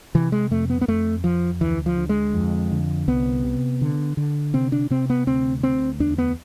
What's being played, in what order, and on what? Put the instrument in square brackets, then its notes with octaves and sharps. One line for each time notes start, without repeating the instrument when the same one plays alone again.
[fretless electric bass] C3 E3
G#3
F2 A3
B3
B3
F2 A3
F2 F3
D2 E3
F3
D3
G#3
F2
D3
C2 B3
C3
D3
D3
C3 C4
D4
C3 C4
B3
D2 C4
D2 C4
E2 D4
B3